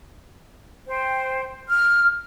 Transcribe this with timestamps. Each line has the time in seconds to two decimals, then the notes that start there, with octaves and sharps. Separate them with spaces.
0.87 C5 G5
1.68 F6